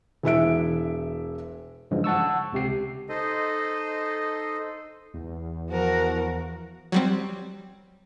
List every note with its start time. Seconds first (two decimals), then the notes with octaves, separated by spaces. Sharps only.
0.23 E1 E4 E5 D7
1.91 G2 C#3 E3 F3 G#3
2.04 F#5 A5 C#6 E6
2.53 C#2 C3 G4 C7
3.09 D#4 A4 C5 D#5
5.14 E2
5.71 F3 F#4 A#4
6.92 F#3 G3 C4